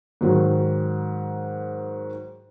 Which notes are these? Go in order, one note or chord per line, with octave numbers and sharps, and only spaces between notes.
G#2 D#3 F#3